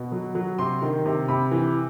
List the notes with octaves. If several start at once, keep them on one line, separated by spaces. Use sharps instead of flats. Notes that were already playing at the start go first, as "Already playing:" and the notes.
Already playing: B2
F#3
F#3
C3 C6
D#3
C3
C3 B5
E3